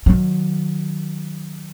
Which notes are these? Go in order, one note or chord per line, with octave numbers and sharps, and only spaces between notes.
D#3 F#3